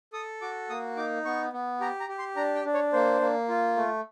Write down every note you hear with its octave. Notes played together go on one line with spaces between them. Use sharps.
A4 D#6
F#4 D6
A#3 D#6
D#4 D6
B3 C#6
B3
G4 A#5
A#5
G4
C6
D4 A#5
G5
D4
C#5
A#3 C5
A#3
F4
A3